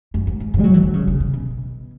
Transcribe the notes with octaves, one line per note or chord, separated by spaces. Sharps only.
F#2
G#2
G#2
G#2
G#3
F#3
E3
D#3
C#3
C#3
C#3
B2